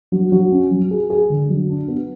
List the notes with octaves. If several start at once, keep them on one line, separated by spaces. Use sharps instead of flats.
F#3
F#3
C#4
F#3
G#4
G#4
D3
F#3
D4
B3